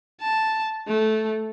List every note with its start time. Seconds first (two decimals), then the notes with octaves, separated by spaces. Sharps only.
0.21 A5
0.87 A3